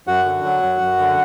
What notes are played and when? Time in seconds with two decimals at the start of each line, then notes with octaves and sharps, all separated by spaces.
0.07 F#2 F#4 F#5
0.25 D3
0.44 F#3
0.62 F#2
0.81 F#2
0.99 D3